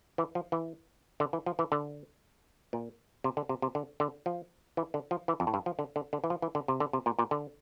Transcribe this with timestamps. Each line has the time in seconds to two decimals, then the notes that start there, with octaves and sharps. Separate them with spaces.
0.18 E3
0.35 F3
0.52 E3
1.20 D3
1.33 E3
1.46 F3
1.59 E3
1.72 D3
2.73 A#2
3.24 C3
3.37 D3
3.49 C3
3.62 C3
3.75 D3
4.00 D3
4.26 F3
4.77 E3
4.94 D3
5.11 F3
5.28 E3
5.40 F2
5.47 A2
5.54 G2
5.66 F3
5.79 D3
5.96 D3
6.13 D3
6.24 E3
6.30 F3
6.42 E3
6.55 D3
6.68 C3
6.80 D3
6.93 C3
7.06 A#2
7.19 A#2
7.31 D3